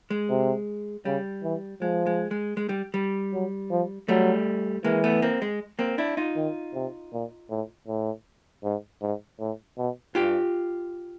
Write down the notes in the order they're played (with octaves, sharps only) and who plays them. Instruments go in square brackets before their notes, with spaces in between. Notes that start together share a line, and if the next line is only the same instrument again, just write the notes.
[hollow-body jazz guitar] G#3
[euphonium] C3
[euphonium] C#3 [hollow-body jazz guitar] G3
[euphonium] E3
[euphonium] F3 [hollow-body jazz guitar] G#3
[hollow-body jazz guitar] G#3
G#3
G#3
G3
G3
[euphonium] F#3
F3
[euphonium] F#3 [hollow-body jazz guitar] G3 A3
[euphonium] E3 [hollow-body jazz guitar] G#3 A#3
[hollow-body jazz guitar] A3 B3
A#3 C4
G#3
A#3 C4
D4 E4
D#4 F4
[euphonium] D#3
C3
A#2
A2
A2
G#2
G#2
A2
B2
[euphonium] G2 [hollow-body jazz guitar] F4 G4